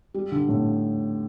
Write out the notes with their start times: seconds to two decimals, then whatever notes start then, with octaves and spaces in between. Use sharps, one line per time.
0.14 G3
0.32 D3
0.49 A2